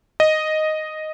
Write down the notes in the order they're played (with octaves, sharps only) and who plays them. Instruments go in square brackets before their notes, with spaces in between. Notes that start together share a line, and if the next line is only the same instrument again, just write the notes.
[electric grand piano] D#5